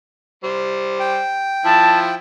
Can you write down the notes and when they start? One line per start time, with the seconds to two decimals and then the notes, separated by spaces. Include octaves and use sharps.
0.44 G3 C5
1.00 G5
1.65 F3 E4 A5